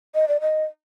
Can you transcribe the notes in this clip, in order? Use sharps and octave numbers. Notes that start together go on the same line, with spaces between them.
D#5
D5
D#5